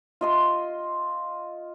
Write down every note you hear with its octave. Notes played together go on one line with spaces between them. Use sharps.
F4 D#5 C6